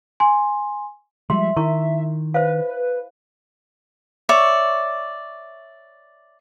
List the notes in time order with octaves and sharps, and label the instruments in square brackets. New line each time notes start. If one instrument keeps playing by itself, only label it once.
[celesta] G#5 C6
[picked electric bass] F3 G3 G#3 [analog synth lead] E5 [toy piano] C6
[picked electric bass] D#3 [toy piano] E4 A#4 C#6
[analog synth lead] B4 [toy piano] C5 E5 F5
[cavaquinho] C#5 D5 E5 C#6